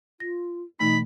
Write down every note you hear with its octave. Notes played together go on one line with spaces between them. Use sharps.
F4 A#6
B2 E3 A3 D#4 B5